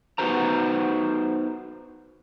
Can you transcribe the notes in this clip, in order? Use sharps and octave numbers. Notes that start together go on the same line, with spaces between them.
B3 D#4 F#4 B4 C5 A#5